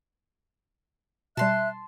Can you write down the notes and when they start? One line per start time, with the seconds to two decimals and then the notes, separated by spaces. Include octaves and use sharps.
1.37 B2 G3 E5 A5 C6 F#6